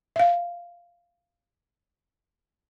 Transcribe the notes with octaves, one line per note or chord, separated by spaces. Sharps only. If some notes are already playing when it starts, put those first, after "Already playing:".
E5 F5